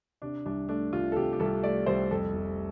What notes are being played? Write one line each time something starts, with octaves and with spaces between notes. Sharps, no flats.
C3 D4
C2 D4
A3 D4
C2 F4
A4
C3 G4
G4
C2 A4
A3 D5
C2 C5
F2 A4
F1